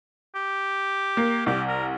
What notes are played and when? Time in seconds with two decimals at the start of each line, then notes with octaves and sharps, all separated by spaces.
0.35 G4
1.17 A#3
1.46 C2 G4
1.68 A#4